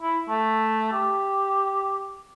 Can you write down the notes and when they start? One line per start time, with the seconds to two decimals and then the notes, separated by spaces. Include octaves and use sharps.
0.02 E4
0.29 A3
0.92 G4